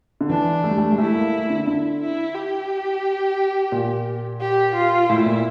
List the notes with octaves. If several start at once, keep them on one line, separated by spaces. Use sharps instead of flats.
D3
E3 D4
A3
G3
A3
G3
A3 E4
A#3
A3
D3
D3 E4
E4
G4
A#2
G4
F4
A2 E4
A#2